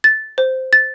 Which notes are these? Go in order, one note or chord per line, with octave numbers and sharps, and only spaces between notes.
A6
C5
A6